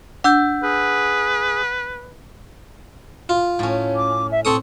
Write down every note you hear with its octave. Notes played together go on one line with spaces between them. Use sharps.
D4 F#5 E6 G6
G#4 B4
F4
A2 C#4
D6
E5
C4 A4 C#6 D#6